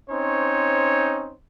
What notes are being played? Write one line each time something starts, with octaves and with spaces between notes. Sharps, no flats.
C4 C#4 D#4 C5 C#5